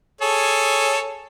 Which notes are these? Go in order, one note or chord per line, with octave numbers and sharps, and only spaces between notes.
G#4 A4 C#5